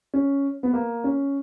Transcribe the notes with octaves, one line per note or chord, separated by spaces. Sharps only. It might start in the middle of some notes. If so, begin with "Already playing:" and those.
C#4
B3
A#3
C#4